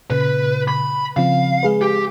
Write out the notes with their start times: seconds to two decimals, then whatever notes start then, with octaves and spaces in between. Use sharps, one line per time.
0.10 A#2 C#3 B4
0.68 B5
1.17 C#3 F3 C4 F5
1.63 G#3 G#4 B4
1.81 G4